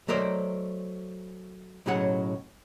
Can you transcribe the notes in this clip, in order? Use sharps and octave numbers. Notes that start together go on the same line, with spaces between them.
F#3 A3 A#4 C5 D5 D#5
B1 A2 C#3 F#3 G#4 F#5